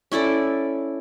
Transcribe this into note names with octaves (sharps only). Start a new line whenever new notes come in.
C#4 E4 A4 D5